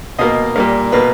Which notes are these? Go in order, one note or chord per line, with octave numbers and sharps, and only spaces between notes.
B2 A#3 D#5
A#2 G3 A#3
B2 A#3 B4